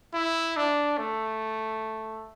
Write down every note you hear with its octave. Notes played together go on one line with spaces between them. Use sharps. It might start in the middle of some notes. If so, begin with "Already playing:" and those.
E4
D4
A3